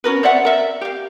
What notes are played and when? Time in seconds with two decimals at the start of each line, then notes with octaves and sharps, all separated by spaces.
0.04 C#4 F#4 A#4 B4
0.23 C5 D5 E5 F#5
0.45 A#4 E5
0.81 G4 F5